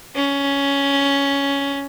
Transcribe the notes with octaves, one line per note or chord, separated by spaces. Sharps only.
C#4